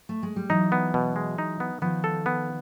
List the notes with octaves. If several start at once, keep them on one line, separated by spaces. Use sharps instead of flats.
A3
G#3
G3
E3 F#3 D#4
B3
B2
G#3
D#4
B3
D#3 F3 B3
A4
B3